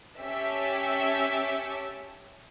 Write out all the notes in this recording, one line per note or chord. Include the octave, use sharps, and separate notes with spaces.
C#4 G4 E5 G5 A5